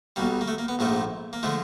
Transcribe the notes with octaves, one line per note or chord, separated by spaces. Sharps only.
B1 B2 G3 A#3
A#3
A3
A#3
B3
A#1 G#2 F3 A3 A#3
A#3
D3 F3 G#3 A3